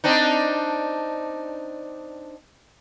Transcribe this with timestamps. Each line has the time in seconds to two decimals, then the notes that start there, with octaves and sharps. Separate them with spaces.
0.04 C4 D4 D#4